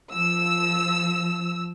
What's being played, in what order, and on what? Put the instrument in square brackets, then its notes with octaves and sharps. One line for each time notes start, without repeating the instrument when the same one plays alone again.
[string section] F3 E6